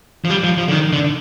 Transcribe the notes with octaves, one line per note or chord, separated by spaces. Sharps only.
F3
G3
F3
F3
D3
D#3
D3